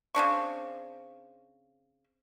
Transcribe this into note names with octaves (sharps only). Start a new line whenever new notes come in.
C#3 C4 D4 C#6